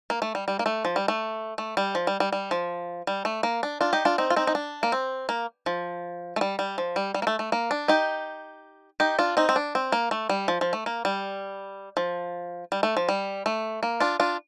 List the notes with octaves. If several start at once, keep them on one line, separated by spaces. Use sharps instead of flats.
A#3
A3
G3
G3
A#3
A3
F3
G3
A3
A3
G3
F3
G3
G3
G3
F3
G3
A3
A#3
D4
D4 F4
D#4 G4
D4 F4
C4 D#4
F4
C4 D#4
D#4
D4
A#3
C4
A#3
F3
A3
G3
G3
F3
G3
G3
A#3
A3
A3
A#3
D4
D#4 G4
D#4 G4
D4 F4
C4 D#4
C4
D4
C4
A#3
A3
G3
F3
F3
A3
A#3
G3
F3
G3
A3
F3
G3
A3
A#3
D4 F4
D4 F4